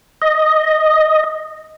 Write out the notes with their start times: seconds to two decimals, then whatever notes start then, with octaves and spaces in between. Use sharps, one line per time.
0.22 D#5